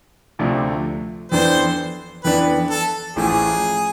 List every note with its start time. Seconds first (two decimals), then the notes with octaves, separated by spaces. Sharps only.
0.39 D2 C3 F3 A3 D4
1.32 F2 E3 B3 D4 C5
2.24 F2 E3 B3 D4 B4
2.70 A4
3.16 A1 A2 F3 A3 G#4